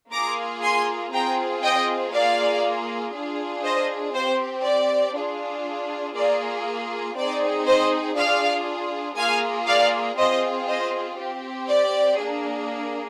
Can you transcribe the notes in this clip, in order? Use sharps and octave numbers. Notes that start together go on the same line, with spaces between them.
A#3 F4 G#4 A#5 D6
G#5 C6
C4 F4 G#4 G5 A#5
D#5 G5
A#3 F4 G#4 D5 F5
D4 F4 G#4
C5 D#5
C4 G4 C5
D5
D4 F4 G#4
A#3 F4 G#4 D5
C4 D#4 G#4 D5
C5 D#5
D4 F4 G#4 D5 F5
A#3 F4 G#4 F5 G#5
D5 F5
C4 F4 G#4 C5 D#5
C5 D#5
C4 G4
D5
A#3 D4 G#4